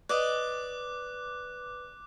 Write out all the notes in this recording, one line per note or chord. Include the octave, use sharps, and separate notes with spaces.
B4 D5 D#5 D6 F#6